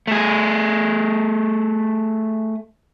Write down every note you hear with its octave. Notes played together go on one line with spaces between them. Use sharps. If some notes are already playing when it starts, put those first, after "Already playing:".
A3 G#4